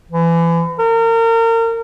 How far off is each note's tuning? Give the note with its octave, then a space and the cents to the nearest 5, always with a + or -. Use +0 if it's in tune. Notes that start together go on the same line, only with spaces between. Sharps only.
E3 +30
A#4 -35